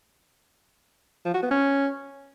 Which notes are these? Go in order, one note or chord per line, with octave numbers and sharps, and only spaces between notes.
F3
F#4
B3
C#4